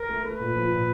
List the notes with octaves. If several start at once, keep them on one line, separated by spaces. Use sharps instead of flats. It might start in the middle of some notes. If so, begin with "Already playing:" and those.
Already playing: A#4
A3
A3 B4
A#2
F3
A#2